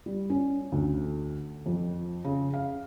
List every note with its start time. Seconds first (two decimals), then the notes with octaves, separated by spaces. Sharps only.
0.06 G3
0.30 C#4
0.72 D2
1.66 F2
2.24 C#3
2.54 F5